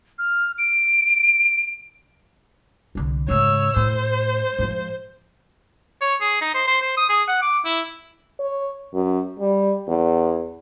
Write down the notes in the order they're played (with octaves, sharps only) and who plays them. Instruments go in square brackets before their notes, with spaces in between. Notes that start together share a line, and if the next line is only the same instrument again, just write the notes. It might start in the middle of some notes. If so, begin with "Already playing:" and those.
[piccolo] F6
D7
[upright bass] C2 D3
[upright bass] G#2 C#3 [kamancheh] C#5 E6
[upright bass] A2 [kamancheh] C5
[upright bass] G#2 F3
[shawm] C#5
G#4
D#4
C5
C5
C5
D#6
G#4
F#5
D6
E4
[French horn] C#5
F#2
G3
E2